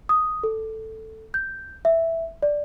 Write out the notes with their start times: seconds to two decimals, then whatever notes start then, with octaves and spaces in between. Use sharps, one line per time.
0.09 D#6
0.43 A4
1.34 G6
1.85 E5
2.42 D5